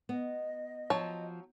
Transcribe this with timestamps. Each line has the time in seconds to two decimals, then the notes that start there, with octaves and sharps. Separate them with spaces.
0.09 B3 D#5
0.90 F3 F#3 C#5 A5